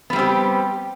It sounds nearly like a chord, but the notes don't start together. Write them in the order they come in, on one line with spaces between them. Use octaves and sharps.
B3 G3 C4 G4